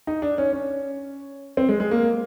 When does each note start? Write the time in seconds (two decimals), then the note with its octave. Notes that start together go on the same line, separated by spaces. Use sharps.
0.07 D#4
0.22 D4
0.38 C#4
0.53 C#4
1.57 C4
1.69 G#3
1.80 G#3
1.91 A#3